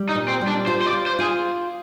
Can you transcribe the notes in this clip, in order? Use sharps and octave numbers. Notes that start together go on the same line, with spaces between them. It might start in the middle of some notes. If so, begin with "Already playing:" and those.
Already playing: G3
D#4
A#2
C4
G3
D4
F4 C5
C5
D5
F4
C5
F4 G#4